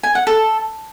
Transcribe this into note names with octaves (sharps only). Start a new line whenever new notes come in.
G#5
F#5
A4